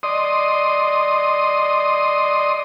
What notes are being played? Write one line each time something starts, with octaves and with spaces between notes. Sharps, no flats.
D5 D#5 C6 D#6